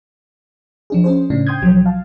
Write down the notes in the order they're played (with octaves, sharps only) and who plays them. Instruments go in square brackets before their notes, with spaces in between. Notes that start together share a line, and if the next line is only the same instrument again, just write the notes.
[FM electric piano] F3 D4 G#4
C#4 G#4 C5
A2 C#3 D4
G5 C6 D#6 G6 G#6
B1 F3 F#3
F5 A5